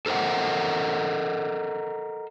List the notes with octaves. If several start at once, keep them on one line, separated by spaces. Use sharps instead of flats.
A4 A#4 C5 D#5 F#5